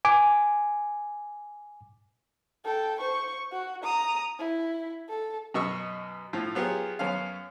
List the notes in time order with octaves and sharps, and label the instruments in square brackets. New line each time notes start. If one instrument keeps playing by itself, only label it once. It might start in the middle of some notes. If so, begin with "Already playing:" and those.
[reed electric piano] G#5 D6
[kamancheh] A4 G5
C5 C#6
F#4
A#5 D#6
E4
A4
[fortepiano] F#2 B2 D#5 C#6 E6
A2 F3
F#3 B3 F4 G4 G#4
F#2 B3 C#4 F5